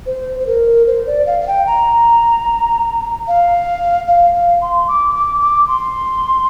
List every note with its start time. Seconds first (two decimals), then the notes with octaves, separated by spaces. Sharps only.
0.06 C5
0.39 C5
0.47 A#4
0.87 C5
1.07 D5
1.27 F5
1.41 F5
1.47 G5
1.67 A#5
3.28 F5
4.08 F5
4.35 F5
4.62 C6
4.88 D6
5.15 D6
5.41 D6
5.68 C6